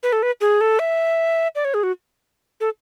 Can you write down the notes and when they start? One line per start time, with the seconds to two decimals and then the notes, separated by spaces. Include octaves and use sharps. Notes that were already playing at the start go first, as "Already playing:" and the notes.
0.03 B4
0.12 A4
0.23 B4
0.41 G#4
0.61 A4
0.79 E5
1.55 D5
1.65 C#5
1.74 G#4
1.83 F#4
2.60 A4